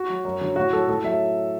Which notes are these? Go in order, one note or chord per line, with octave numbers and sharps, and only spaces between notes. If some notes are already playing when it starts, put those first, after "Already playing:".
Already playing: F#4
F#3
F#2
D3 F#3
A2 F#4
F#3 A4
A2 A4
F#3 E5